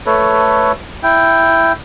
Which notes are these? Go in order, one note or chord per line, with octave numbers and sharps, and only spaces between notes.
A3 A4 B4 C#5
E4 G5